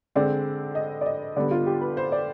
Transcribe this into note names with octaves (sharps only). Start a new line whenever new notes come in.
D3 G#3 C4 D5
D#5
D5
D#5
D3 G3 B3 D5
F4
G4
B4
C5
D5